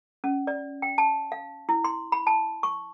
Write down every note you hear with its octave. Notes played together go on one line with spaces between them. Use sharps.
C#4
D5
G5
A5
F5
E4
C6
B5
A5
C#6